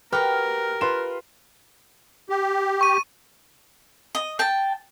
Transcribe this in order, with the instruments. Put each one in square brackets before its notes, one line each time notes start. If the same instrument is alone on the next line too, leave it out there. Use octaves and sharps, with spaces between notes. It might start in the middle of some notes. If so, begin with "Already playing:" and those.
[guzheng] F#4 G4 [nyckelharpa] A#4 [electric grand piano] B4 F6
[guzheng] F4 [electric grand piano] B4 C6 E7
[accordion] G4
[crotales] C#6 D#7
[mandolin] D#5
G5 A5